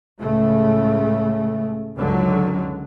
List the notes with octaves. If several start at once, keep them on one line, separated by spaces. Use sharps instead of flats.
C#2 A2 C#3 A3
C#2 F#2 D3 D#3 F#3